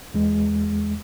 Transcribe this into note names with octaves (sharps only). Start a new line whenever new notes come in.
E2 G#3